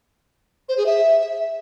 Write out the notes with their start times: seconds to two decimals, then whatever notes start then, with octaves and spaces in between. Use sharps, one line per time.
0.69 C5
0.77 G#4
0.86 E5